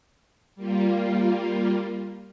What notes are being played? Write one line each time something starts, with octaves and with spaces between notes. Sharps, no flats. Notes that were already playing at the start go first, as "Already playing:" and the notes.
G3 A#3 F4